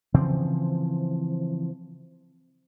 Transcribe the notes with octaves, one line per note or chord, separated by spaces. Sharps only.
C#3 E3 F3 C4